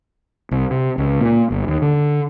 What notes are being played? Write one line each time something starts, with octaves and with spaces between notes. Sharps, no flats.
C2
C3
C#2
A#2
G1
D#2
D3